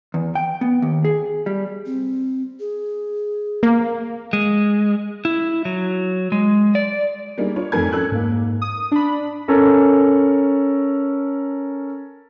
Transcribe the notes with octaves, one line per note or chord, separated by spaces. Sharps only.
E2
G5
B3
D#2
G#4
G3
C4
G#4
A#3
G#3
E4
F#3
G#3
D5
G3 A#3 D4 D#4 G#4
D4 F4 C#5
F2 G#2 A3 A#4 G#5 G#6
C#4 A4 E6 F#6
G#2 A#3
D#6
D4 B5
C#4 A4 A#4